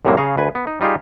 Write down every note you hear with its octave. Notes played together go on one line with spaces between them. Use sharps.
C2 F#2 A2 C3 F#3 A#3
C#3 G#4 C#5 F5 A#5
D2 B4 G#5
B3
D#4
G3 D#4 F4 G4 G#4